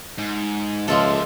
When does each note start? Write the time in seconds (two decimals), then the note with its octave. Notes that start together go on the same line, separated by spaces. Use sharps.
0.18 G#2
0.88 C#2 F3 G#3 A#3 A4 E5